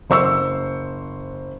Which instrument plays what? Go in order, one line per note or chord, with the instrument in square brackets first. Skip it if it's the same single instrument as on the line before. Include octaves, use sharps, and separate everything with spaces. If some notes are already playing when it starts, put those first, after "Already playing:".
[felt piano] F#1 C5 C#6 E6